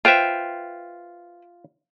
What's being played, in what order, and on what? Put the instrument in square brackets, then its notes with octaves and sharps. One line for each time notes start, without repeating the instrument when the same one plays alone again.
[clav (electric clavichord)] F4 E5 [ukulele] B4 C5 G5